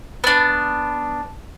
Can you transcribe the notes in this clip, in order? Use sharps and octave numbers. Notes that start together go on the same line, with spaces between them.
B3 D4